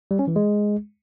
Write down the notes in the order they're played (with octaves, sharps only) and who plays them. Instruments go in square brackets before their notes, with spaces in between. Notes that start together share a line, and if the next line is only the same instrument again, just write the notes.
[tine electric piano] G3
C#4
E3
G#3